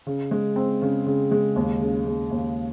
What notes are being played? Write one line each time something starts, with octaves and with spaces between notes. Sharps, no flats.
C#3
G#3
C4
C#3
C#3
G#3
D#2
C#3
G#3
D#2